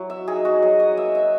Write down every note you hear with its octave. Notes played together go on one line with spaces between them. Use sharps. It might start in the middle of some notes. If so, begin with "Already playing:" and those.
Already playing: F#3 E4
E5
D#4 G#4
F#4
F#3 G#4
D#5
A#3 E5
E5